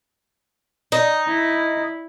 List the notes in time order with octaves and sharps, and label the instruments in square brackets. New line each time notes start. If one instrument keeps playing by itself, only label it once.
[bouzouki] D#4
[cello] E4